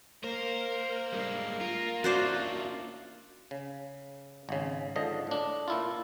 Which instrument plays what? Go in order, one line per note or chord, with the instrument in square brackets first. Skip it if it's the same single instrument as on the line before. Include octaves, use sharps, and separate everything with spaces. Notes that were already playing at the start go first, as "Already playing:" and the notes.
[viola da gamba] A#3 [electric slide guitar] A#4 [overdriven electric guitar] C5
[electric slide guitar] G3 G#3 D4
[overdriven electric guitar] F4 [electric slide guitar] A#4
[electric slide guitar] C#4 D4 E4 [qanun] F#4 C5 D5
[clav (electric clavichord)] C#3
G#1 C#3
G#2 D3 F3 D#5
A2 D4
A#2 E4 F4